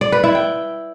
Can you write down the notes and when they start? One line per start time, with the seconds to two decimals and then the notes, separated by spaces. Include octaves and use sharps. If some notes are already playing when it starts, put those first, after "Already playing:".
0.01 D5
0.12 B4
0.24 E4
0.35 G5